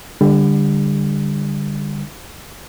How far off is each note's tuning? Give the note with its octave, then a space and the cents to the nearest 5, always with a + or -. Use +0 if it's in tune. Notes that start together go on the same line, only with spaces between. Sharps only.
D3 +5 G3 +30